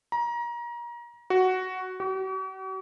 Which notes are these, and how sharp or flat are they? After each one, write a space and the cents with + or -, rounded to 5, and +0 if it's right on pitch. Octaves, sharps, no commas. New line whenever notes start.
A#5 +30
F#4 +5
F#4 +45